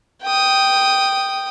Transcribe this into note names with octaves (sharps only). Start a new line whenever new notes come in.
G5 D#6